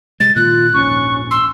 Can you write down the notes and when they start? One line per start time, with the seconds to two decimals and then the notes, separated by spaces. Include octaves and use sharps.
0.20 C3 G#3 A6
0.36 A#2 D#3 F4 F#6
0.74 A#1 D#2 G#2 C#4 C#6
1.31 C6 E6